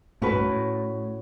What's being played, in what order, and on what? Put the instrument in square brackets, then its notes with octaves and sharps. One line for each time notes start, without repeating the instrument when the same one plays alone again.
[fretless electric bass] A2 [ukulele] C#4 F#4 B4
[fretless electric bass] G#2
A2